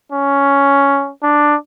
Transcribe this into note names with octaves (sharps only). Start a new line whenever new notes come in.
C#4
D4